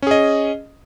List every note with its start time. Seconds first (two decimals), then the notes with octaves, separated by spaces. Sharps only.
0.02 C#4
0.07 G#4
0.11 D#5